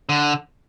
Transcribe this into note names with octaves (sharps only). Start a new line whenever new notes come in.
D3